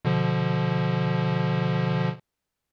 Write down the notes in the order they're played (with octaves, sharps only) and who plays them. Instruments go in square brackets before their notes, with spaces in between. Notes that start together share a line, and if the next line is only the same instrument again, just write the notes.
[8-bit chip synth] B2 D3 F3